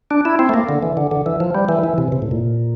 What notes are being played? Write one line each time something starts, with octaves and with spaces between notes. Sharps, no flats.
D4
E4
C4
A3
A#3
D3
E3
D3
D3
E3
F3
G3
E3
E3
C3
C3
A2
A#2